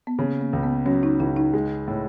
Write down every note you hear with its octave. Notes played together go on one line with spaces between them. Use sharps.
B3
C#3 A#3
A#3
C#2
B3
F#3 C#4
D#4
C#2 E4
D#4
G#3
A2